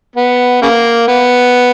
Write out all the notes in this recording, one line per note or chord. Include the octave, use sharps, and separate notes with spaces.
B3
C#3 A#3
B3